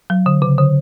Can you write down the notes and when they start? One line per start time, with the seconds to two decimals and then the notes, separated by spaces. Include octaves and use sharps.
0.10 F#3
0.26 D3
0.42 C#3
0.58 D3